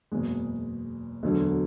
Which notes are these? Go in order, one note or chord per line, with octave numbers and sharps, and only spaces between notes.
F#1 E2 B2 G#3
E1 D2 D3 F#3